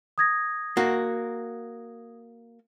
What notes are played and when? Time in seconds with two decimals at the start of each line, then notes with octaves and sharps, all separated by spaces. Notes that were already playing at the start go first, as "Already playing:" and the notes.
0.18 D#6 G#6 A#6
0.77 A#3 F#4